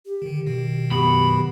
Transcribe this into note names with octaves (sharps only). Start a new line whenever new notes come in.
G4
D3 D#3
B2 D#3
F#2 B3 F#4 G4 B5